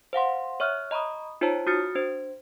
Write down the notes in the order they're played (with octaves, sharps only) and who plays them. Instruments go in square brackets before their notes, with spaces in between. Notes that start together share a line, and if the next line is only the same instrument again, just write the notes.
[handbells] C5 F5 F#5 C6
C#5 E5 C#6 F6 F#6
D#5 A#5 B5 C#6 D#6
D#4 F4 C5 C#5 A5 A#5
F#4 D#6 F6 A6 C#7
D4 C5